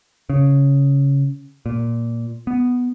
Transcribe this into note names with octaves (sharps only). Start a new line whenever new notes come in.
C#3
A#2
B3